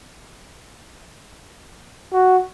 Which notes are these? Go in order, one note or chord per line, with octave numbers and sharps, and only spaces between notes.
F#4